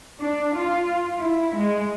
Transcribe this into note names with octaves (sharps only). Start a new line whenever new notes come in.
D4
F4
E4
G#3